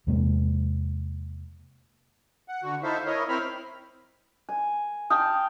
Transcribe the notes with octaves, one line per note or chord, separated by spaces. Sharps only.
E2 C3 G#3 A#3
F#5
D3 F#4
D#4 E4 A4 C5 E5 F5
E4 A#4 C#5 D#5
C4 E4 A#4 C5 B5 F6
G#5
F5 G5 A5 D#6